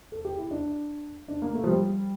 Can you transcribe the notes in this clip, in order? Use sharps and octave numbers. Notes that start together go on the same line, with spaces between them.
A4
G4
E4
D4
D4
A#3
A3
F3
G3